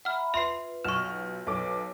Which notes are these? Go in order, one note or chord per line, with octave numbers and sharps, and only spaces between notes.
E5 F#5 A#5 B5 F6
F4 B4 E5 C6 C7 F7
B1 F#4 C#6 F6 E7
B1 A4 B4 C#5 D6